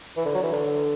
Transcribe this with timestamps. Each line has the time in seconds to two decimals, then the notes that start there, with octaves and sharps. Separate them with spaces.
0.17 E3
0.25 D3
0.34 F#3
0.43 E3
0.52 D3